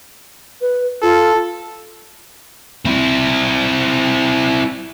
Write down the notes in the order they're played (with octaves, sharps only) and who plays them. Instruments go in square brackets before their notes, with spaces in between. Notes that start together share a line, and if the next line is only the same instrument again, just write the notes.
[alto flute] B4
[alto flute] F4 [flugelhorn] A4
[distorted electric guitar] C4 E4